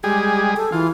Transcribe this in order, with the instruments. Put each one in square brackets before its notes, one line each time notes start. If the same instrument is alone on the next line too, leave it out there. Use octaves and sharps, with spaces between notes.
[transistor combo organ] G3 G#3 G#4 [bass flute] G4
[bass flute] A4
[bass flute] E3 [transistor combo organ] F4